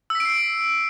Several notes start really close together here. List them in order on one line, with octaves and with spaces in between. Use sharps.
E6 B6 D7 C7